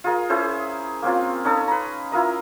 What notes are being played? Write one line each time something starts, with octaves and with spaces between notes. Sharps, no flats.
F4 G#4 A#4 D#5
C#4 E4 G#4 C5
A#3 C4 C#4 F4
C#4 D#4 A4
B4 A#5
E4 F4 A#4 D#5